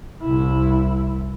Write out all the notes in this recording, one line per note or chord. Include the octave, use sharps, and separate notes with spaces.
C2 E4